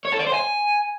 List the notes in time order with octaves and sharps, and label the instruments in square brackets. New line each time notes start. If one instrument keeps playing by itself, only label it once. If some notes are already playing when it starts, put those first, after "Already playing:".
[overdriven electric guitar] C#5
A4
D5
C5
G#5